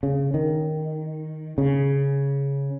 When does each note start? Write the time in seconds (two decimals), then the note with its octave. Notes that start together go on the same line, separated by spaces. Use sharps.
0.03 C#3
0.34 D#3
1.58 C#3